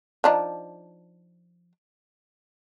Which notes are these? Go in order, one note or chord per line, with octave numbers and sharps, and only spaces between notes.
F3 D4 D#4